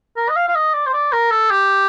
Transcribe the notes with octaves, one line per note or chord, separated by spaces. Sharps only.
A#4
D#5
F5
F5
D#5
D5
C5
D5
A#4
A4
G4